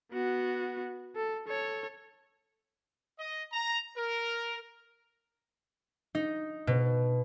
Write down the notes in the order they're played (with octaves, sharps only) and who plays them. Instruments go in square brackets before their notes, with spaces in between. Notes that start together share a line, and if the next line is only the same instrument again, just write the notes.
[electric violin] B3 F#4
A4
A4 C#5
[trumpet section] D#5
A#5
A#4
[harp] D#4
B2